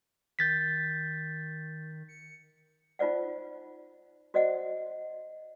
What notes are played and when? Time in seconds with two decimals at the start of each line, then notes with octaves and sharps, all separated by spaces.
0.39 D#3 G6 A6 B6
2.08 C#7
2.99 D#4 F4 C5 D5 F#5
4.34 F#4 C5 D5 D#5 F#5